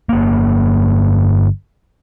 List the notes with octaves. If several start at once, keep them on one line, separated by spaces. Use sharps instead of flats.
G1 A#3